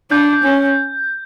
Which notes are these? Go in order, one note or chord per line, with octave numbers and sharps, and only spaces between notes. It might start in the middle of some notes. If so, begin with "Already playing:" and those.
D4 G6
C#4